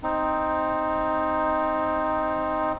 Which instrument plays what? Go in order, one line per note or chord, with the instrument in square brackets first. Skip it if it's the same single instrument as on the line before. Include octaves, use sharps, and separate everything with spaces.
[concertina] C4 D#4